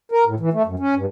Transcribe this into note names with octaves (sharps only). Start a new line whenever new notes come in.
A#4
A2
E3
A3
F#2
C#4
G2